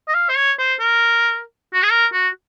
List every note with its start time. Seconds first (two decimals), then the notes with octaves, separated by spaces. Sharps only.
0.08 D#5
0.14 F5
0.29 C5
0.37 C#5
0.59 C5
0.80 A#4
1.74 F#4
1.83 G#4
1.91 A#4
2.13 F#4